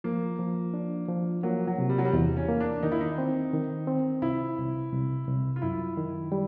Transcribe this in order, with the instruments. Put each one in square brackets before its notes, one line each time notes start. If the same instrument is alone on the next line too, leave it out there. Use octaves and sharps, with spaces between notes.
[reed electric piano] F3 [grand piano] A#3
[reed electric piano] F3
D4
F3
[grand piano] F#3 [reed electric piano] A#3
[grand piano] F#3
[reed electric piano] C3
[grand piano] G3
F#3
G3
[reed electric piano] E2
[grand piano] C#4
[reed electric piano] A#3
[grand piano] D4
[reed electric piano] D#3 [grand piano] D#4
[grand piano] E4
D#4
[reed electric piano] C4
D#3
C4
[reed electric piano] C2 [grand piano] E4
[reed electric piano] C2
C2
C2
[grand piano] F4
[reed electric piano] F#2 [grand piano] E4
[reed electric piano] D#3
G3